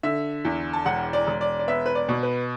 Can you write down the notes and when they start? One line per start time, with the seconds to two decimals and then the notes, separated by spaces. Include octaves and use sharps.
0.03 D3 E5
0.45 E2
0.73 A5
0.85 E1 F#5
1.13 D5
1.27 E1
1.41 D5
1.59 D5
1.68 B3 E5
1.86 B4
1.95 D5
2.09 B2
2.23 B4